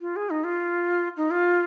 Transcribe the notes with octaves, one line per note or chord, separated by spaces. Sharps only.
F4
G#4
D#4
F4
D#4
F4